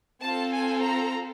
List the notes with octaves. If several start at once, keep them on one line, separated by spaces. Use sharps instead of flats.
C4 F4 A4 A5
G#5
A#5